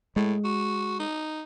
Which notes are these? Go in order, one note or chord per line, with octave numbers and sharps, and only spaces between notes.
A2 G#3
F#4
D#4